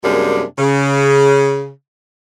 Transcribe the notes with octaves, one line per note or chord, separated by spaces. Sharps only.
F#2 C3 G3 G#3 A#3 D4
C#3